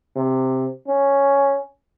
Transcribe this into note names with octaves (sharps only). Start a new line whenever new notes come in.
C3
C#4